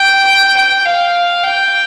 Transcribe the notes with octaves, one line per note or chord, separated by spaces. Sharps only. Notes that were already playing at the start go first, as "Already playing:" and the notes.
Already playing: G5
G5
F5
G5